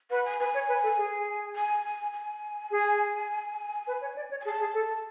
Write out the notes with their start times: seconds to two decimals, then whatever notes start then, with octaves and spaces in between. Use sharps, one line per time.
0.11 B4 F#5
0.25 G#5
0.39 B4 G#5
0.54 C#5
0.69 B4
0.83 A4
0.97 G#4
1.55 G#5
2.13 G#5
2.71 G#4
3.87 B4
4.01 C#5
4.16 D5
4.31 C#5
4.41 G#5
4.45 G#4 A5
4.60 G#4
4.74 A4